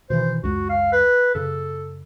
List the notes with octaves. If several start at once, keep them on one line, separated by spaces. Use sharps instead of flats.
B2 D#3 E3 C5
C#2 F#2 F#4
F5
B4
F#2 C#3 A4